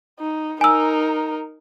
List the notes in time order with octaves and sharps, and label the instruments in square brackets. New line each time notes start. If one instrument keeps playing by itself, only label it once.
[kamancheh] D#4
[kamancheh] D#4 A#4 [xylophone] G#5 E6